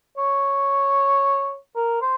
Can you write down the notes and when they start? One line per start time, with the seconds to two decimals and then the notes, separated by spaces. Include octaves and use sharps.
0.18 C#5
1.76 A#4
2.02 C5